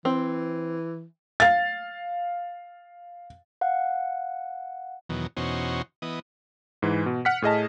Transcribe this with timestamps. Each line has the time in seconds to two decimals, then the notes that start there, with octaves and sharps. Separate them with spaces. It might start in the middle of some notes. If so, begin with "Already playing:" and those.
0.05 E3 C4
1.40 F5 A6
3.61 F5 F#5
5.09 E2 B2 D#3 F#3
5.37 E2 B2 C#4 D#4 F#4 C5
6.02 E3 B3 D#5
6.82 G#2 E3
7.06 B2
7.25 F#5 F6 B6
7.42 A2 G#4 D#5 A5